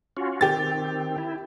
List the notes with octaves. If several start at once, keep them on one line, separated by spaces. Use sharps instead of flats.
C#4 F4 F#4
D#3 C4 G4 A6
E4